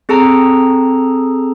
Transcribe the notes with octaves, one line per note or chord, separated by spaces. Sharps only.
C4 G#4 A4 A5 A#5